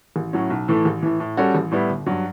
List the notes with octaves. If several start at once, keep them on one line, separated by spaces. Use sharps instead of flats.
A1
A2 F#3 C#4
B1
A2 E3 A3
A1
A2 E3
A2
G3 C#4 F#4 A4
A1
A2 G3 B3 E4
G1
G2 F#3